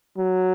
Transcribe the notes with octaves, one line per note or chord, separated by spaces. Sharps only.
F#3